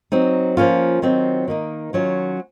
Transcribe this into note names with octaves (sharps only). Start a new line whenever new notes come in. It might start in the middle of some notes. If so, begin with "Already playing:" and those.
F#3 C4 D#4
F3 A#3 C#4 F4
D#3 F#3 C4 F4
D#3 A#3 D#4
D#3 F#3 C#4 F4